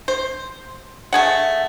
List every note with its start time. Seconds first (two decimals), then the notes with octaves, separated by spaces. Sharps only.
0.08 C5
1.13 A3 G#4 F#5